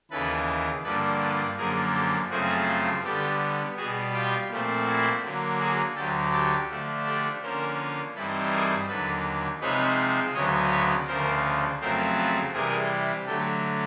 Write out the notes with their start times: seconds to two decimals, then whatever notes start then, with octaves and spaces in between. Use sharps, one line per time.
0.11 D#2 C#3 E3 A4 B4
0.84 G2 D3 F3 A#3 D4 A4 B4
1.21 A4 B4
1.57 F#2 D3 F3 A#3 G#4 A#4
1.94 G4 A4
2.30 F#2 C#3 F3 A3 C4 F#4 G#4
3.04 D3 G3 B3 G4 A4
3.77 B2 G3 B3 F#4 G#4
4.13 F4 G4
4.50 A#2 F3 A3 C4
4.86 E4 F#4
5.23 D3 F#3 A#3
5.60 F#4 G#4
5.95 D2 D3 F#3 G4 A4
6.32 G4 A4
6.69 D3 F3 A3 D4
7.05 G4 A4
7.42 D3 F3 A#3 C#4 A#4 C5
8.15 G2 E3 G3 C4 D#4 A4 B4
8.51 G#4 A#4
8.88 D#2 D3 F#3 A4 B4
9.61 C3 F3 G#3 C4 D#4 B4 C#5
10.34 D2 C#3 F#3 B3 C#5 D#5
10.71 B4 C#5
11.07 D2 C#3 F3 A#4 C5
11.80 F2 C#3 F#3 A3 C4 A#4 C5
12.17 A4 B4
12.53 C3 E3 G3 G#4 A#4
13.26 D3 F#3 A3 G4 A4